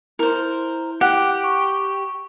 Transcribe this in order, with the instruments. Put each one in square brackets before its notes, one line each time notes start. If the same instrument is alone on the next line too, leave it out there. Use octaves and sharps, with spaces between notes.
[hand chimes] E4 [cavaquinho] A#4 C5
[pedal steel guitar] G4 [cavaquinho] F#5
[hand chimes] C#6